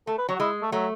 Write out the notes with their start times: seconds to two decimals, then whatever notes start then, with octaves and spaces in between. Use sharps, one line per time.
0.07 A3 A4
0.18 B4
0.29 F#3 C#5
0.35 F#4
0.40 G#3 E4
0.62 A3
0.72 F#3 A3